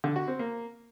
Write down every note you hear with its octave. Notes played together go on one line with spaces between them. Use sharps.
D3
F#4
C4
A#3